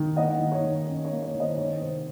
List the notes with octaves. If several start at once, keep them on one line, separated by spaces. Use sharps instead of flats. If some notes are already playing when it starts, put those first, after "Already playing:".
Already playing: D#3
A#3 D#5 F#5
D#3
C#5
D#3
C#4
C#5
A#3
C#5
D#3
C5 D#5
D#3 C#5
C3 C5